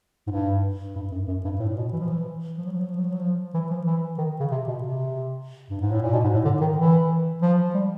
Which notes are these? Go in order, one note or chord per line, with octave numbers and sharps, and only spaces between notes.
G#2
G2
G2
F#2
F#2
G2
A2
A#2
B2
E3
F3
E3
F3
F#3
F3
F#3
F3
F#3
F3
F#3
F3
E3
F3
E3
D#3
C#3
C3
B2
C3
G2
G#2
A2
A#2
B2
G#2
A2
D3
D#3
E3
F3
G3